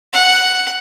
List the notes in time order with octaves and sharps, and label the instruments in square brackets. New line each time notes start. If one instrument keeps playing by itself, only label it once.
[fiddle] F#5